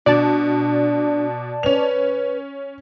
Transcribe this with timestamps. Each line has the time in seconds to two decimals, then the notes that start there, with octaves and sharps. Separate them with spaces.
0.06 B2 D4 D5 A5
1.63 C#4 B4 F7